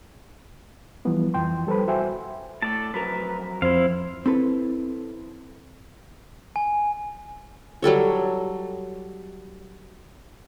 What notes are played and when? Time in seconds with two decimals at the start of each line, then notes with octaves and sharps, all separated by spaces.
1.05 E3 F3 G3 B3 E4
1.34 F2 E3 F3 G5 C6
1.67 G3 A4 B4 C5 B5
1.88 F#4 C5 E5 G5 G#5
2.62 A2 A4 D5 A5
2.94 F2 F#3 A#4 B4
3.62 F2 E4 C5 F5
4.26 C4 E4 A4 B4
6.56 G#5
7.82 F#3 G3 A4 C#5